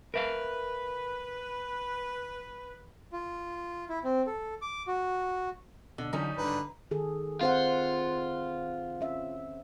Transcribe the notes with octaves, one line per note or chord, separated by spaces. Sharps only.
A#4 B4 E5 F5
F4
E4
C4
A4
D6
F#4
B2 D3
D3 E3 F#3 G3 C#4 D#4 A#4
G#1 G2 D3 B4 A#5
D#3 G#4 A4
C4 F4 C5 F#5
C#4 E5